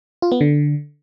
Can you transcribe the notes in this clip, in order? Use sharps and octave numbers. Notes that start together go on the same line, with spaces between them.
F4
B3
D3